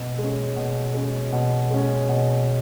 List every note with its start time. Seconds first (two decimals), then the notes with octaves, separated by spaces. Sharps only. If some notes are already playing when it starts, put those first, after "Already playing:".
Already playing: B2
0.18 G#3 C#4
0.56 B2
0.94 G#3 C#4
1.32 B2
1.70 G#3 C#4
2.09 B2